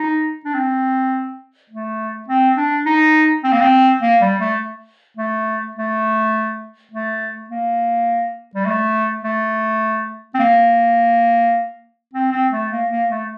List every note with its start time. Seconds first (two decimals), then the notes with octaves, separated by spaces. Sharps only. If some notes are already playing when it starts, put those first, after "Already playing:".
Already playing: D#4
0.45 D4
0.54 C4
1.70 A3
2.29 C4
2.57 D4
2.86 D#4
3.43 C4
3.52 A#3
3.60 C4
4.02 A#3
4.21 G3
4.40 A3
5.17 A3
5.76 A3
6.91 A3
7.50 A#3
8.55 G3
8.66 A3
9.24 A3
10.34 C4
10.39 A#3
12.14 C4
12.32 C4
12.52 A3
12.71 A#3
12.91 A#3
13.10 A3